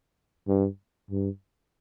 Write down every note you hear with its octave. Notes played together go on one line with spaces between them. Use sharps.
G2
G2